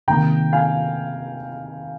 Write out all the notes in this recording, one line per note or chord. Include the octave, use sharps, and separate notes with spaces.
C3 D#3 A#3 G5 A#5
F5 G#5